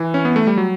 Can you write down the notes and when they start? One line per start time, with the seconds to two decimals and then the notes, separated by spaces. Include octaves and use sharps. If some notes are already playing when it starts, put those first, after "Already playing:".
Already playing: E3
0.14 C#4
0.25 B3
0.36 A3
0.47 G3
0.57 F#3